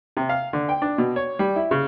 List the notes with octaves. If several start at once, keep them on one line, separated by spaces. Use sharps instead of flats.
C3
F5
D3
G5
D4
B2
C#5
G3
E4
C#3